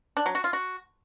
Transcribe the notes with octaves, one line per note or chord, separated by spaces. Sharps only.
D4
F#3
F#4
F4
F#4